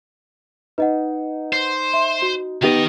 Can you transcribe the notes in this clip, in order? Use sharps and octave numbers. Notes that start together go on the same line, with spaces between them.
D#4 B4 D#5 F#5
C5
E5 C6
F#4
D#3 B3 D#4 G4 D#5 F7